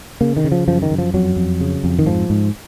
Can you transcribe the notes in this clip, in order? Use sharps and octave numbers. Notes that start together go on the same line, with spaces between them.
C#3 A#3
D#3
C#3
F3
F#2 F3
D#3
F#2
F3
F2 F#3
F2
C#3
F2
D#3
G#2 F3
G#2